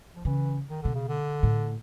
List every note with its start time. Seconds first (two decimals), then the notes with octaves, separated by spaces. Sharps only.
0.16 F3
0.25 C#3 E3
0.70 D#3
0.82 B2 D3
0.95 C#3
1.08 D3
1.43 A2